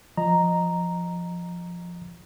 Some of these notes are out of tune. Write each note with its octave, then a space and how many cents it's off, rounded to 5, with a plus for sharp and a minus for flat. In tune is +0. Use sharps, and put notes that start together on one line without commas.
F3 +0 D#5 -10 A#5 +0